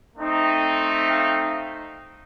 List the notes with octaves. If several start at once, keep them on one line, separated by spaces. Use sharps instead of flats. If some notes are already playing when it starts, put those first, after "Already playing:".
A3 C4 D#4
F5 G5